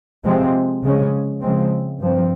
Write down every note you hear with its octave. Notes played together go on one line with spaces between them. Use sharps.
C3 F3 G#3 C4
C#3 F3 G#3 C#4
C#3 F3 G#3 C4
G2 F3 C4